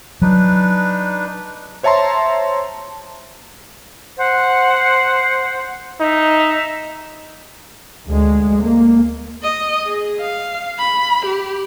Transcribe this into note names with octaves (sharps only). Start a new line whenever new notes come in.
F#3 D4 D#4 B4
C5 C#5 E5 A5 A#5 C6
C5 F#5
D#4 E5
D2 G#3
A#3
D#5
G#4
F5
B5
G4